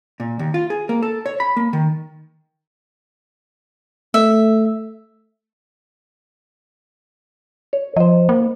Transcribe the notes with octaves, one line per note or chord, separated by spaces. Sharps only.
A#2
D#2
F4
G#4
A#3
A4
C#5
B5
A#3
D#3
A3 E5
C#5
F3 C5 D#5
A#3